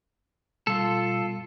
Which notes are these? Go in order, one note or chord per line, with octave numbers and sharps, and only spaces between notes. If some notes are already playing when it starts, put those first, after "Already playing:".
B2 G3 F4 A4